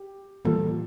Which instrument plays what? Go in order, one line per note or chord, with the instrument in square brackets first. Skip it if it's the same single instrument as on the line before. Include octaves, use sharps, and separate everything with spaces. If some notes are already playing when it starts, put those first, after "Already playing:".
Already playing: [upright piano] G4
[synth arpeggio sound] A2 E3 G3 A#3 F4 [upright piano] A4